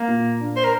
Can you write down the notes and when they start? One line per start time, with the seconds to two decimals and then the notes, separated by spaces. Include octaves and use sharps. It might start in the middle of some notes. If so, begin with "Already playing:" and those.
Already playing: A#3
0.08 A#2
0.40 D4
0.56 C5
0.64 A#4